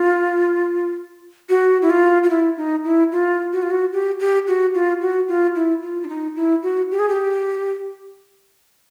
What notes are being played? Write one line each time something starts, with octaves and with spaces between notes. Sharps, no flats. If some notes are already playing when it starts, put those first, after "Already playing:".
Already playing: F4
F#4
E4
F4
F4
E4
D#4
E4
F4
F#4
F4
F#4
G4
G4
F#4
F4
F#4
F4
E4
F4
D4
D#4
E4
F#4
G4
G#4
G4